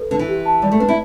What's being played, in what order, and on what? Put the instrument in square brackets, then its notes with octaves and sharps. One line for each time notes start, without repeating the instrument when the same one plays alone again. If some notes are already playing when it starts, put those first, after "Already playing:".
Already playing: [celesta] A4 B4
[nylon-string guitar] D3 [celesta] B4
[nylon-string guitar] E3
[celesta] G4
A5
[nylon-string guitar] G3 [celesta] D5
[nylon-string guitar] A3
[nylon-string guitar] D4 [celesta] B4
[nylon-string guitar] E4